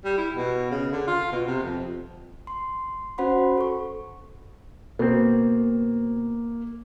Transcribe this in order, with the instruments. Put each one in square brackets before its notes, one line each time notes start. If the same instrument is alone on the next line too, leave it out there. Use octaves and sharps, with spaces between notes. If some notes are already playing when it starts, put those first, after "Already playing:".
[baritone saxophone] G3
E4
B2
C#3
D3
F4
B2
C3
F2
[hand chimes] C6
C#4 F#4 C5 F#5 B5 C6
A4 C#6
[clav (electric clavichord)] B2 C4 [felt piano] A#3